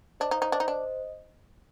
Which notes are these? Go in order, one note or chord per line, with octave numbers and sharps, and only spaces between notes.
D4 C5 D#5
D#4 D5 F5
D#4 C5 D#5
D4 C5 D#5
D#4
D4